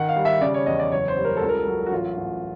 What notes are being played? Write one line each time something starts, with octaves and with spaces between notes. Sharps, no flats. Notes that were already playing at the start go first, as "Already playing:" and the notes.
Already playing: D#3 F#5
F5
G3
E5
C#3 D5
C#5
E2 D#5
D5
F#1 C#5
C5
G3
A#4
C#2 A4
A#4
F#3
F#4
A1 F4
A1